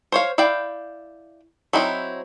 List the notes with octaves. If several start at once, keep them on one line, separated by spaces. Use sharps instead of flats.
C5 C#5 F5
E4 D5 F5 G5
F#3 C4 D#4 E4